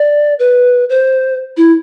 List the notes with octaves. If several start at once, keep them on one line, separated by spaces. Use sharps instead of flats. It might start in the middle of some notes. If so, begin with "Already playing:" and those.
Already playing: D5
B4
C5
E4